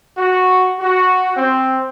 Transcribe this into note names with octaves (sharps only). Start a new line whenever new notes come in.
F#4
F#4
C4